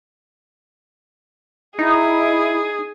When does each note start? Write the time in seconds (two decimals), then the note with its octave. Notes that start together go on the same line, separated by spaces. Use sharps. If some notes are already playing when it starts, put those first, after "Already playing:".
1.79 D#4 E4 G#4